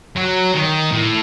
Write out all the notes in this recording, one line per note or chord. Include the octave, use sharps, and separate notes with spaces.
F#3
D#3
A2